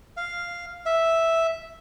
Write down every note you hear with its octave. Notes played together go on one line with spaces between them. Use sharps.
F5
E5